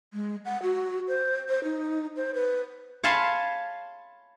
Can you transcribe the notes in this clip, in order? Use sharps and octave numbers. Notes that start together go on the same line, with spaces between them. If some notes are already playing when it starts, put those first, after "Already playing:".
G#3
F#5
F#4
C5
C5
D#4
C5
B4
C#5 F5 G#5 A5 B5 C6